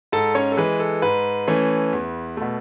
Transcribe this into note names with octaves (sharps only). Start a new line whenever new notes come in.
G#2 A4 A5
C#4 C#5
A4
E3 G#3 B4
A4
G#2 B4
E3 A3 C#4
E2
B2 A3